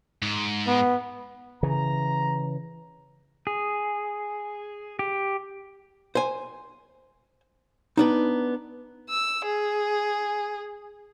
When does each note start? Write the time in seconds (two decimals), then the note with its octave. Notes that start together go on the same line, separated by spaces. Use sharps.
0.22 G#2
0.67 B3
1.63 C#3 E3 A#5
3.47 G#4
4.99 G4
6.15 C5 G#5
7.97 B3 D4 D#4
9.09 E6
9.45 G#4